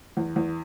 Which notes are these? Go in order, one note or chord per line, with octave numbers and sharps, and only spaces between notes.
E2
E2